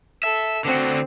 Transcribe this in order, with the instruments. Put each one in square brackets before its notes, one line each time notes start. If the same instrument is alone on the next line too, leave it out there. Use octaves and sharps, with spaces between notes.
[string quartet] A4 [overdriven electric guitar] E5
[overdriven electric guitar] D3 F#4 [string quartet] C4